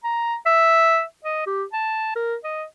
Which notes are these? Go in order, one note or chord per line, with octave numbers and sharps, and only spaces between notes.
A#5
E5
D#5
G4
A5
A#4
D#5